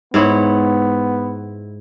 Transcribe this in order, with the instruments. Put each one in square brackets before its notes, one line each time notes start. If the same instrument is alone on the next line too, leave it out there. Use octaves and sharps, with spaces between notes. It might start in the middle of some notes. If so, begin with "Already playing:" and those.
[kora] G#2 E4 C#5 [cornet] B3